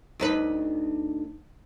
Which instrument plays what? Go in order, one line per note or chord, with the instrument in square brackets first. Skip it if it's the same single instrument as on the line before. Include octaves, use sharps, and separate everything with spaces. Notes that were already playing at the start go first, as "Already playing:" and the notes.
[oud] D2 D#4 B4